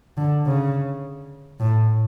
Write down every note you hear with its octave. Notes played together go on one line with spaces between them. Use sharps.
D3
C#3
A2